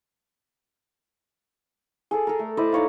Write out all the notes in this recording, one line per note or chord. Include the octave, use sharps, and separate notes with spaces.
G#4 A4 D5
A4 A#4
A3
E4 C5 D5 D#5
D#4 C#5 F5